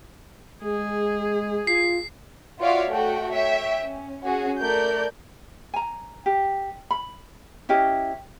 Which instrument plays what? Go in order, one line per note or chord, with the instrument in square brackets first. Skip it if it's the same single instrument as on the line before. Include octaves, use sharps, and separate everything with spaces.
[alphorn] G#3 [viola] G#4
[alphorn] F4 [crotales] C7
[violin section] F4 F#4 C#5 D5 E5 F5
A3 F#4 G5
C#5 E5 G5
C#4
C#4 F#4 G#4
A3 A#4 D5 G6
[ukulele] G#5 A#5
G4
B5
C#4 E4 G4 D#5